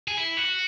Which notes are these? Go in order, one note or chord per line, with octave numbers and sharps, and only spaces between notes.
G#4
E4
F#4